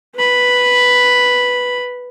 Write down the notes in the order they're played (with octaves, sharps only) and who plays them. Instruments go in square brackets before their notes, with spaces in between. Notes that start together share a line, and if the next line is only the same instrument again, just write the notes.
[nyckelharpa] B4 B5